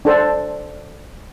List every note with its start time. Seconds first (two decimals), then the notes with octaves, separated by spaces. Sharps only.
0.05 D4 A4 C5